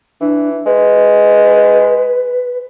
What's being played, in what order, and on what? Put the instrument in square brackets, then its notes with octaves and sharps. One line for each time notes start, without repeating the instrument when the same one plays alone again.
[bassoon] E3 [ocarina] D4
[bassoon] G#3 [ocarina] B4